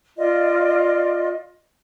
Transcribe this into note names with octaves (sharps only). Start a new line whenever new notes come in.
F4 D5 D#5